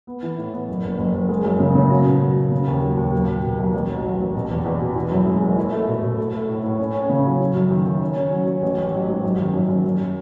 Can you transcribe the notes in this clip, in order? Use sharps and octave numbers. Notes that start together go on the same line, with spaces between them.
B3
E3
A2
B3
F#1
F#1
F#1
F#1
G#3
F#2
C#3
C#3
F#3
B2
F#3
B2
C#3
D#2
F#3
D#2
B1
B2
B2
B1
A1
F#3
F#3
A1
B2
E2
E2
B2
E3
F#2
G#3
F#1
E4
A3
B2
B2
A3
A3
A2
A2
C#4
C#4
C#3
F#3
F#3
F#2
D#3
D#3
C#4
C#4
F#3
C#4
A1
A1
F#3
G#2
F#2
D#3
F#2
F#2
F#2